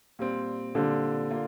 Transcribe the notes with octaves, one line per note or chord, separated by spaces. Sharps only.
A#2 G3 C4
A#2 D3 G3 C4
A#3 F4